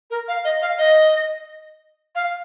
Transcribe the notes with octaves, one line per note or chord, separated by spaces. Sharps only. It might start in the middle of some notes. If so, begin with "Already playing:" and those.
A#4
F5
D#5
F5
D#5
F5